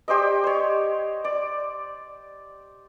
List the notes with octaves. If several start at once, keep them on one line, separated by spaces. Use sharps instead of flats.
G4 C5 D5 D#5
C5 C#5
D5